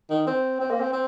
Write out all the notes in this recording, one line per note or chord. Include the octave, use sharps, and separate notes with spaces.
D#3
C4
C4
A#3
C4
C4